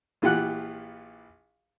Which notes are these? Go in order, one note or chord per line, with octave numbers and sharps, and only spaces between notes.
A#1 E3 F4 G4 F#5 F#6